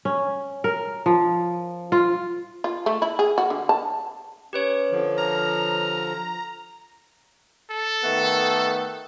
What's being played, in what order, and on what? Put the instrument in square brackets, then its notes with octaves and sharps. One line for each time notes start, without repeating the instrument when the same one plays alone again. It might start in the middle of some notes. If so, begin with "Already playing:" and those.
[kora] C#4
A#4
F3
F4
[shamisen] F4
A3
E4
G#4
F#4
D3
A5
[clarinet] C#4 [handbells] G4 B4 C#5
[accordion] D3 F3
[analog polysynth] A#5 [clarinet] F6
[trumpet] A4
[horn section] D#3 A3 B3